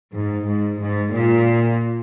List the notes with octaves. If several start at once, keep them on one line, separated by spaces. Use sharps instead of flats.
G#2
G#2
G#2
A#2